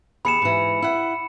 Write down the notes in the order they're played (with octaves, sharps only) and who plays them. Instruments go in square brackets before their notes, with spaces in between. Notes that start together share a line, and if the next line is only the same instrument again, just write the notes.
[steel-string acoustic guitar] D#2 G#4 [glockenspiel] B5 C#7 E7
[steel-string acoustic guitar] G#2 E3
E4 F#5